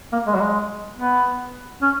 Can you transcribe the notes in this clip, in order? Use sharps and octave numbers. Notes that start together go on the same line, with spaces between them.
A#3
G#3
F#3
G#3
B3
C#4